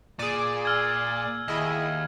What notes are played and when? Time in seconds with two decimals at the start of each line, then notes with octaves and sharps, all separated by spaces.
0.19 A#2 G#4 D5
0.65 E6 F6 G#6
1.48 D#2 E4 G#4 D#5